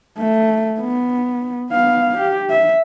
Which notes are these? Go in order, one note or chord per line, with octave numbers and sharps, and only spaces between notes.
A3
B3
B3 F5
G4
E5